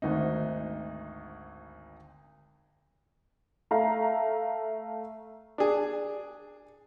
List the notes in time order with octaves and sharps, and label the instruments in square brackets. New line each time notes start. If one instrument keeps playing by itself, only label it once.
[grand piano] G#1 D2 D#4
[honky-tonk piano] A3 F5 A#5
[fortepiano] D4 G#4